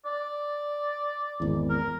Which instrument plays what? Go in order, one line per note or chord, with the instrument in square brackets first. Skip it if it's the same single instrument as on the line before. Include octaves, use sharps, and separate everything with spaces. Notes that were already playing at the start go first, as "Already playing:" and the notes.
[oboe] D5
[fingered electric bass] G#1 E2
[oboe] A#4